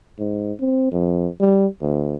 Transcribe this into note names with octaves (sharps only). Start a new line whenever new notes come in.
G#2
C4
F2
G3
D2